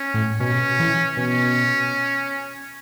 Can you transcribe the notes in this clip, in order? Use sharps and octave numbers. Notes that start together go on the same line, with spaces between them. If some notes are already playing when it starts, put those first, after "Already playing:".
Already playing: C#4
A2
B2 C#4
E3
B2 C#4